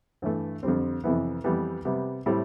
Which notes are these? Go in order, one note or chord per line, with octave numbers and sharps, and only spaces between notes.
G2 E3 A3
F2 D3 G3 C4
F2 C3 E3 B3 E4
F2 E3 G3 B3
C3 G3 B3
A2 G3 C4 E4